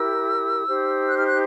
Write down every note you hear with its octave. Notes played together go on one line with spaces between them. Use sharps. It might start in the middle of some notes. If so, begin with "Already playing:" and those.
Already playing: E4 G4 A#4 E6
D#4 G4 C5
F#6
F6
F#6